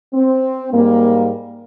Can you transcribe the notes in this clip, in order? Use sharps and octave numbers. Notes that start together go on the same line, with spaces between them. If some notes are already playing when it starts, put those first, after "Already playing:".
C4
G#2 G3 A#3